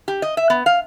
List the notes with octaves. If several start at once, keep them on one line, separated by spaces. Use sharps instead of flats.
G4
D#5
E5
B3
F5